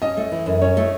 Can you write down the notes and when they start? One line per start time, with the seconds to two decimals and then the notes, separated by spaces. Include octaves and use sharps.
0.02 C#4 D#5
0.17 A3
0.31 E3
0.46 F#2
0.61 C#4 C#5
0.77 A3